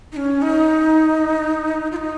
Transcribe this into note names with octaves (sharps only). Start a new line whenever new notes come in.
D#4
C#4
D#4
F4
D#4